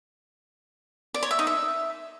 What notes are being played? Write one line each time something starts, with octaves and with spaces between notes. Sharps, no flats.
D5
C#5
E5
D#4
E5